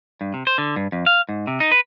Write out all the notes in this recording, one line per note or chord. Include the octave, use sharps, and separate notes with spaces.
G2
C3
C5
D3
G2
F2
F5
G#2
C3
D#4
B4